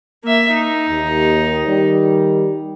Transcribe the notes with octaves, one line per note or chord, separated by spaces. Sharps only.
A#3 E5
D#4
D#2
D#3 G3